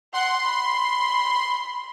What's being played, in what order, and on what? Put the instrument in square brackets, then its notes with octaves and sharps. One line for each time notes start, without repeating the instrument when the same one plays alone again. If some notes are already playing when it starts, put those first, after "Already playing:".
[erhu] F#5 [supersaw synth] C6
[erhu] B5